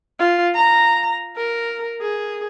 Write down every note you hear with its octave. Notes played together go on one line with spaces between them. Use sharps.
F4
A#5
A#4
G#4